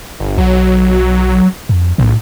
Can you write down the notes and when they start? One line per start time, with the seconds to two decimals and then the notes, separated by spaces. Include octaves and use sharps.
0.20 G1
0.38 B1 F#3
1.69 F2
1.98 B1 A2